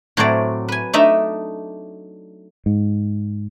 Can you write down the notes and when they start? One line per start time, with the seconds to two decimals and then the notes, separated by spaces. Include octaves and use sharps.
0.17 A2 F#3 A3 C4 D5
0.68 B4 G#5
0.93 A3 D4 D#4 D#5 E5
2.66 G#2